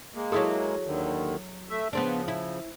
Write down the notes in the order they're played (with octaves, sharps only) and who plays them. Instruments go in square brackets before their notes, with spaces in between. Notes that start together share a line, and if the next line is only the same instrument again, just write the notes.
[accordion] G#3 A#3
[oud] F#3 E4 A4 [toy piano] G#4 D#6
[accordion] D#2 D3 D#3
A3 E5
[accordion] C#3 F3 [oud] B3 C4 D4
[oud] E4